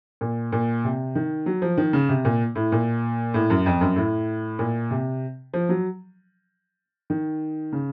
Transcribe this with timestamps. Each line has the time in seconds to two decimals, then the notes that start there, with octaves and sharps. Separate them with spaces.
0.21 A#2
0.52 A#2
0.84 C3
1.15 D#3
1.46 F#3
1.62 F3
1.77 D#3
1.93 C#3
2.09 C3
2.25 A#2
2.55 A2
2.72 A#2
3.34 A2
3.50 F#2
3.66 F2
3.81 F#2
3.96 A2
4.59 A#2
4.91 C3
5.54 F3
5.69 F#3
7.10 D#3
7.72 C#3